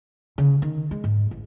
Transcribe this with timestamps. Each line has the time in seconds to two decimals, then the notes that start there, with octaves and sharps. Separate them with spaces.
0.38 C#3
0.62 D#3
0.91 G#3
1.04 G#2
1.31 A1